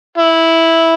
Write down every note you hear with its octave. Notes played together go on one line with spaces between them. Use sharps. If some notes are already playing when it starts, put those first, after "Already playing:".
E4